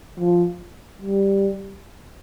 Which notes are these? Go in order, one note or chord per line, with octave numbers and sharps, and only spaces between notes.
F3
G3